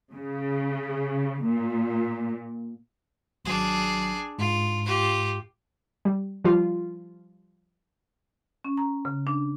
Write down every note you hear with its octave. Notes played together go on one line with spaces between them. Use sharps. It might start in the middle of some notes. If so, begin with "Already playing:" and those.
C#3
A#2
G#1 F#3 D4 G#4
G#2 F4
F4 G4
G3
F3 G3 F4
C#4
A#5
C#3
D4